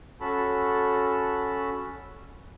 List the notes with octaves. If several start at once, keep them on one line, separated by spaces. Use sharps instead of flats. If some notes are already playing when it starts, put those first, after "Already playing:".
C#4 F#4 A4 A5 B5